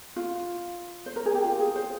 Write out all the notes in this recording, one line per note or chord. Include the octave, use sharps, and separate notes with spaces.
F4
C5
A#4
G#4
G4
F4
G#4
C5